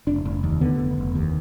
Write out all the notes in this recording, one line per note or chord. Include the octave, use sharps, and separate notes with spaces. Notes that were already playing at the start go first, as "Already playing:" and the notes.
F1 D4
F1
D#2
D3 B3
F1
F1
D#2